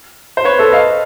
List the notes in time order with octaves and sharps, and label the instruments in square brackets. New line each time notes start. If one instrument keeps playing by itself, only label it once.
[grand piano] C5
B4 C#5
A4 B4
D#5 F5